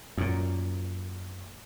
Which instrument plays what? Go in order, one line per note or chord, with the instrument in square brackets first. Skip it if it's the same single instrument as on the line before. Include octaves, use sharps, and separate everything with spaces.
[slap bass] F#2 A#2